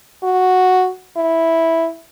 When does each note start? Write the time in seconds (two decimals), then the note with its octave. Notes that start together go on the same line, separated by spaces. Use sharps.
0.23 F#4
1.17 E4